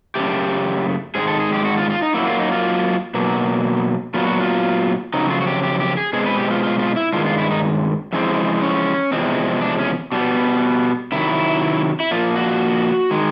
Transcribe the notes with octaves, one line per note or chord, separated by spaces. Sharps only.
F#2 C#3 E3 A3 G4
G#2 D#3 G#3 G#4
A4
G#4
G4
F#4
F4
F4
D#4
F#2 C#3 F#3 A#3 E4
F4
D#4
F4
B2 F#3 A#3
A#2 F#3 B3 F4
F#4
F4
F2 C#3 F#3 D#4
F4
F#4
G4
G4
G4
G#4
B2 G#3 C4 G#4
B4
G4
F4
F4
F4
E4
G2 D#3 G#3 F4
F4
E4
D#4
F2 C#3 E3 G#3 C4
C#4
E2 C3 F3 G#3 C4
D4
C#4
B2 G3 B3
C3 D#3 F#3 E4
E4
A#2 F3 A#3 F4
F#4
D#3 G#3